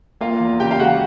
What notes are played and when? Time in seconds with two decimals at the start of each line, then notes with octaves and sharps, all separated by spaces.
0.21 A#3 F4 F5
0.40 E2
0.60 C#3 G4 G5
0.71 F5
0.79 G#3 F#4 F#5